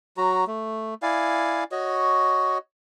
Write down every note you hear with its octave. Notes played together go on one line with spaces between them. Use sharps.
F#3 F#4 A#5
A3
E4 D5 F5 G#5
F#4 C#5 D#5